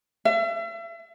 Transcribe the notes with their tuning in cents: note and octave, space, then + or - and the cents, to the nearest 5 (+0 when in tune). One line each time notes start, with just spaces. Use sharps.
E5 +40